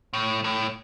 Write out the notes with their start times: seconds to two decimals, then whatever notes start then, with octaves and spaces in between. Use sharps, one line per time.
0.13 A2
0.44 A2